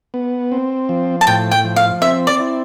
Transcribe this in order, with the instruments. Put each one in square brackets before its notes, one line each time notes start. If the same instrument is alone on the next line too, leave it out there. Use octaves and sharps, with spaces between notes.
[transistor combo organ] B3
C4
F3
[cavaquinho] A5
[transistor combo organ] A2 [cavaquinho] G5
[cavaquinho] G5
[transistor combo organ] F3
[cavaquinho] F5
[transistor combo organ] C4 [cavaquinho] E5
[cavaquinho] D5
[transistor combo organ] E4